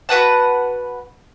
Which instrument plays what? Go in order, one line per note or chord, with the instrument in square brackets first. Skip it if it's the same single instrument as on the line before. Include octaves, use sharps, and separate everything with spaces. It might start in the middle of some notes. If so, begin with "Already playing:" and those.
[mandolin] F#4 B4 F#5 A5